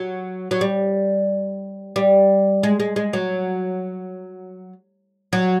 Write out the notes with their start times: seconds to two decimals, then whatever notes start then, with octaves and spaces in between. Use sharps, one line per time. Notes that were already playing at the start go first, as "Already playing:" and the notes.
Already playing: F#3
0.51 F#3
0.61 G3
1.96 G3
2.63 G#3
2.80 G#3
2.96 G#3
3.13 F#3
5.33 F#3